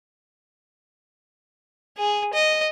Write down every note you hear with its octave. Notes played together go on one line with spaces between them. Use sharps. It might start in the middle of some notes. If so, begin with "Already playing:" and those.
G#4
D#5